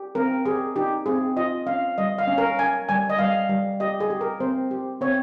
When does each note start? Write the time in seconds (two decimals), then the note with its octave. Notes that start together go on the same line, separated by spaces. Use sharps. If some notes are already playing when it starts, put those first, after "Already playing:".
Already playing: G4
0.15 C4 A#4
0.45 G4 G#4
0.76 D#4 G4
1.06 C4 G#4
1.36 F4 D#5
1.67 C#4 F5
1.98 G3 D#5
2.18 F5
2.27 C#4
2.38 A#4
2.59 C#4 G#5
2.89 G3 G#5
3.10 D#5
3.19 G3 F5
3.49 G3
3.80 G4 D#5
4.00 G#4
4.10 G4
4.21 A#4
4.40 C4 C5
4.71 G4
5.01 C4 C#5